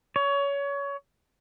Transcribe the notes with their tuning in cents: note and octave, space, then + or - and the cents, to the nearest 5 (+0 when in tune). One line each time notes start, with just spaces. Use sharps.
C#5 +25